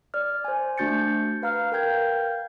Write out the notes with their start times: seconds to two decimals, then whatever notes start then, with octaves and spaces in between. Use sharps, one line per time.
0.14 D5 F6
0.45 C5 G#5
0.78 A3 D4 F#4 G6 A6 C#7
1.42 B4 F5 A#5 F6
1.72 A#4 F5 G5 G6 G#6